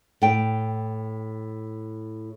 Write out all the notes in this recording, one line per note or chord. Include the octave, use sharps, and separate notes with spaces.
A2 G5